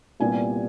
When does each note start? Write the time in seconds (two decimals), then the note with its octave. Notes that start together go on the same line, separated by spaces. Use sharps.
0.20 C2 A#2 G3 B3 G#5